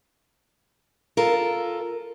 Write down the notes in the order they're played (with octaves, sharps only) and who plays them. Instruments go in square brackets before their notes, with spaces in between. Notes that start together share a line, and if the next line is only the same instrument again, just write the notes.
[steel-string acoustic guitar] F4 A4 A#4